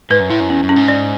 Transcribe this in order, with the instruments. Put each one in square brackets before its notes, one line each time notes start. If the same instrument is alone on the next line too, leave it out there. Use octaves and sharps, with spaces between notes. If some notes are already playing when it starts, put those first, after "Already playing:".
[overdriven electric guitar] G#2 [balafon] B4
[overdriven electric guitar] F#2
[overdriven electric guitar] A2 [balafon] E4
[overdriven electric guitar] F#2
[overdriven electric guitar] E2 [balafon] C#4
[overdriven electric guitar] F#2
[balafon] C#4
[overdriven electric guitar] G#2
[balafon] D5